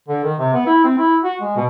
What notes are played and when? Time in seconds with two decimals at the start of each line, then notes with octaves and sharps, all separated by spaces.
0.09 D3
0.25 D#3
0.39 C3
0.54 B3
0.67 E4
0.84 C4
0.98 E4
1.24 F#4
1.42 G#3
1.56 B2